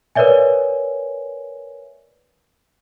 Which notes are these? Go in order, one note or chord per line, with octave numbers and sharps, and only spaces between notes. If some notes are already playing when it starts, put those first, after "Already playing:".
A#4 B4 C#5 D5 E5 G#5